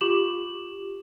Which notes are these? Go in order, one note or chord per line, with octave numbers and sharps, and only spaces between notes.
F4 G4 D6 E7 F#7